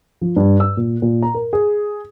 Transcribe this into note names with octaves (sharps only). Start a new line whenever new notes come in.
F3
G2
E6
A#2
A#2
A#5
A#4
G#4